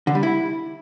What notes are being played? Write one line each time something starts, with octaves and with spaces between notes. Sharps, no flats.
D3
G3
E4